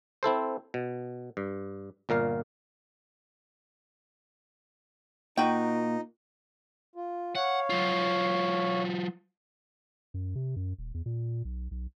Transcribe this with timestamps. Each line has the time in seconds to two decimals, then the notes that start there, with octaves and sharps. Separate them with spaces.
0.23 C4 E4 A4 C5
0.74 B2
1.37 G2
2.09 G1 A#2 A#4 F5
5.37 A#2 D#4 F#4 G5
6.95 F4
7.35 C#5 F5 F#5
7.70 F#3 F4
10.14 F#2
10.35 C3
10.56 F#2
10.78 D#1
10.94 E2
11.06 A#2
11.45 B1
11.71 B1